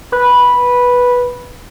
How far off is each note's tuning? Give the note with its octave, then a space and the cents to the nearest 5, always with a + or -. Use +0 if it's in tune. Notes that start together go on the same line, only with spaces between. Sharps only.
B4 -5